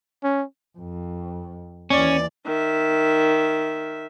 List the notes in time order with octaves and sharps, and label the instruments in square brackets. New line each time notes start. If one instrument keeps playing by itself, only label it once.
[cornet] C#4
[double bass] F2
[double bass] D#2 E3 [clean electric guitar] C#4 [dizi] D5
[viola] D#3 E5